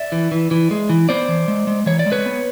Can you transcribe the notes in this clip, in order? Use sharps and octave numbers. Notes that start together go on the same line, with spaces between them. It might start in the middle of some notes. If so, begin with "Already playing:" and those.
Already playing: D5 E5
E3
E3
E3
G#3
E3
B3 C5 D5
E3
G#3
G#3
E3 C#5
D5
G#3
B4 C#5
B3